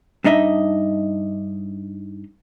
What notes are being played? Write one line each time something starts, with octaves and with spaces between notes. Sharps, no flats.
G2 D4 D#4 D#5 E5